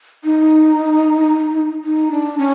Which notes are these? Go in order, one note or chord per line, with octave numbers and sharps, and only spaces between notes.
D#4
D#4
D4
C#4